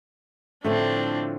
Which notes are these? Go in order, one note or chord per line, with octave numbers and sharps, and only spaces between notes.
A2 D3 F3 A3 C4 D4